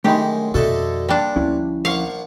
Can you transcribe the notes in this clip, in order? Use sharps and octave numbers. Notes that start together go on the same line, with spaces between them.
F#2 D#3 G#3 A3 D4 G4 B5
F2 B2 D3 D#4 F#4 A4 E5
A#2 G3 D4
D2 F3 C#4 E4
A#1 F5 F#5 C#6